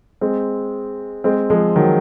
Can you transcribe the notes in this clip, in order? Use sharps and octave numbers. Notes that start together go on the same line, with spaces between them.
G#3 C4
G#3 C4
F3 G#3
D#3 F#3